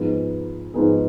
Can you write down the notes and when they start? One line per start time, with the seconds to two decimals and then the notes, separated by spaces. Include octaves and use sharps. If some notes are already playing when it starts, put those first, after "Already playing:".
Already playing: G#2 F3 B3 D#4 G#4
0.74 G#2 F3 B3 D#4 G#4